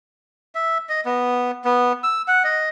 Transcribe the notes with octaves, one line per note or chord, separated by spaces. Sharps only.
E5
D#5
B3
B3
E6
F#5
D#5